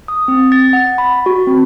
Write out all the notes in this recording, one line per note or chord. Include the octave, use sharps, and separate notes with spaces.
D#6
C4
A6
F#5
B5
F#4
C4